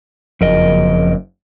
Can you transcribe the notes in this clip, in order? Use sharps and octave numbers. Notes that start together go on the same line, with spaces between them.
F#1 F2 A#4 D#5